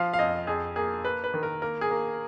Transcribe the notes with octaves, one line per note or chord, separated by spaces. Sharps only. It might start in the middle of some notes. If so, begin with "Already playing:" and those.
Already playing: F3 F5
F5
F2 D#5
F2 G#4
A#3 G#4
A#3 B4
B4
D#3
A#4
A#3 A#4
G#4
A#3